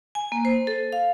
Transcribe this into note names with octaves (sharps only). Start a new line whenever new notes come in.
G#5
A#3
C5
A4
F5